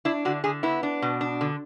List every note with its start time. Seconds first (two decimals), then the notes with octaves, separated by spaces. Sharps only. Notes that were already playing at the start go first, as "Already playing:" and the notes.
0.05 D4 E4
0.25 D3 F#4
0.44 D3 G#4
0.63 B3 E4
0.83 D4
1.02 B2
1.21 D4
1.41 D3